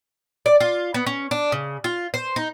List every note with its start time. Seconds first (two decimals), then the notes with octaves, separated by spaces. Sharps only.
0.46 D5
0.61 F4
0.94 B3
1.06 C#4
1.31 D4
1.52 C#3
1.84 F4
2.14 C5
2.36 D#4